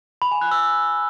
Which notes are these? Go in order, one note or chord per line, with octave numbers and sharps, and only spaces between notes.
B5
G#5
F#6
E6